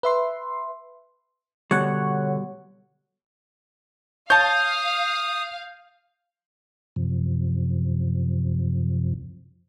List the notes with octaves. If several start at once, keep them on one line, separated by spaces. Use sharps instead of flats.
B4 E5 C6
B2 D3 G3 C#5 F#5
C#5 F5 A5 D#6 G6
F#2 C3 F3